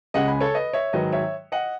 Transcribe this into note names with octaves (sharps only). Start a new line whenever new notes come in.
C#2 C#3 G#3 D#5 F#5
G#5 B5
A4 C#5
B4 D#5
C#5 E5
G#2 D#3 F#3 B4 D#5
C#5 E5
D#5 F#5